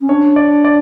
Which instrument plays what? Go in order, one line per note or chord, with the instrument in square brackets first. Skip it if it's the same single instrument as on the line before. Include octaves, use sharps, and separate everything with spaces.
[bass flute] C#4
[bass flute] D4 [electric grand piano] C#5
[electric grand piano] D5
D5